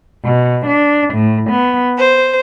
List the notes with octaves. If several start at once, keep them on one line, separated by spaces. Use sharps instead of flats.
B2
D4
A2
B3
C5